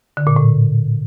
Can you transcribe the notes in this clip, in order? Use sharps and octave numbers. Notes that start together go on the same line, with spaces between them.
D3
A#2
A2